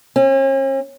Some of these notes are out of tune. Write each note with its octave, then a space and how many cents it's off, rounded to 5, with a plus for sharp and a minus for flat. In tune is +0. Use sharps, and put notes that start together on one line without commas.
C#4 -45